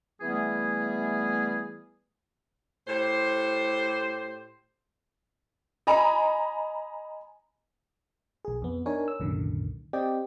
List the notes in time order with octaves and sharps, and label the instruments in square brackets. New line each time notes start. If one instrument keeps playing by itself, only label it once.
[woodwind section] E3 G3 A3 B3 G#4
[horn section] A2 G4 C5
[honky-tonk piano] D#5 G#5 A#5 B5
[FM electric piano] B1 G#4
F2 B3
D4 D#4 A#4 C#5 G#5
E6
C2 F#2 A#2 D3 D#3
C4 G4 D5 D#5 G5